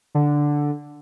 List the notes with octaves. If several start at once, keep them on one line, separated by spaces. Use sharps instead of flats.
D3